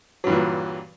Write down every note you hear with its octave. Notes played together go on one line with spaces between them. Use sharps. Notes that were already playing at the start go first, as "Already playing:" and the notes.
G2 A#2 E3 F#3